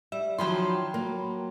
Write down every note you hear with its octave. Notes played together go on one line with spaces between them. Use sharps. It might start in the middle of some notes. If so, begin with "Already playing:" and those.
G3 E5
D#3 F3 F#3 G5 B5 C6
F#3 A#3